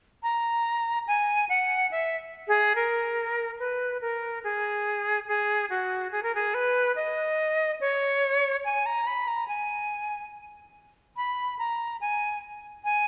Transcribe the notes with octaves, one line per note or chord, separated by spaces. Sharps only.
A#5
G#5
F#5
E5
G#4
A#4
B4
A#4
G#4
G#4
F#4
G#4
A#4
G#4
B4
D#5
C#5
G#5
A#5
B5
A#5
G#5
B5
A#5
G#5
G#5